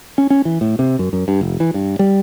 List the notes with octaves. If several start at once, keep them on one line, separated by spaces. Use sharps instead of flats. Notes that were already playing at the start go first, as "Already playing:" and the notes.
C#4
C#4
E3
A2
C3
F#2
F#2
G2
F1
E3
G2
G3